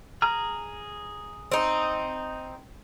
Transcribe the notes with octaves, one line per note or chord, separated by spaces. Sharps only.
G#4 A#5 F6
C4 D#4